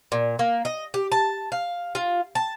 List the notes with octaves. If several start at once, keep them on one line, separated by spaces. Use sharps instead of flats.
A#2
A#3
D#5
G4
A5
F5
F4
A5